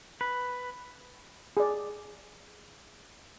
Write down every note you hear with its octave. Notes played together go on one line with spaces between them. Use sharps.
B4
G#4 D5